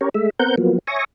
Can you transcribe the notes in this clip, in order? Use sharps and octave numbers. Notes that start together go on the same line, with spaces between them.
C#4 G4 A#4 C#5
G#3 A3 E5
B3 C4 A#4 F#5 G6
F3 F#3 A#3 B3
C#5 E5 G#5 C#6 D#6 A#6